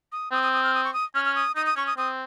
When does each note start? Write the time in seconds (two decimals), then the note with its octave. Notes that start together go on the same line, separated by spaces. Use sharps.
0.12 D#6
0.32 C4 D#6
0.43 D#6
0.53 D#6
0.63 F6
0.74 D#6
0.84 C#6
0.94 D#6
1.15 C#4 F6
1.25 F6
1.35 D#6
1.56 D#4 D#6
1.66 D#6
1.76 C#4 C#6
1.87 D#6
1.97 C4 D#6